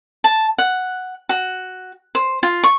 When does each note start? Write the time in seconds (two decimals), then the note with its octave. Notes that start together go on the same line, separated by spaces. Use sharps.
0.24 A5
0.58 F#5
1.29 F#4
2.15 C5
2.43 F4
2.64 C#6